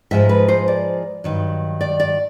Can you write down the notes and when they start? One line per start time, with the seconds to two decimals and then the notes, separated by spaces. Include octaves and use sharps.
0.11 G#2 F3 G#3 E5
0.29 B4
0.48 C5
0.68 D5
1.24 G2 D#3 F#3
1.81 D5
2.00 D5